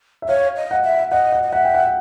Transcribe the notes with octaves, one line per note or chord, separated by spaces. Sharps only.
E5
C#5 F5
D#5
F#5
E5
D#5 F#5
F#5
D#5
E5 F#5
G5
F#5